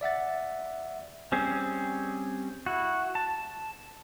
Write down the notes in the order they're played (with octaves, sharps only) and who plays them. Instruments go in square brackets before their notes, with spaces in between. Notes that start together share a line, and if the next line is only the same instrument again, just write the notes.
[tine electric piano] D5 E5 F#5 A6
[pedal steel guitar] G3 C4 C#4 G#4
E4 F#4
A5